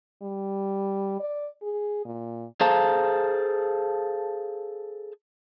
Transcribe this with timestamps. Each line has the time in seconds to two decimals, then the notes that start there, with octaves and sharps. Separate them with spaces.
0.22 G3
1.20 D5
1.62 G#4
2.05 A#2
2.61 G#4 A4 C5 F5 A5 A#5